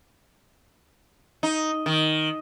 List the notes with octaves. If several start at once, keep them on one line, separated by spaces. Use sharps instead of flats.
D#4
D#3